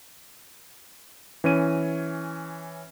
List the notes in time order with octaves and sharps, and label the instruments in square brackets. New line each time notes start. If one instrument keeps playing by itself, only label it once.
[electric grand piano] E3 C#4 D#7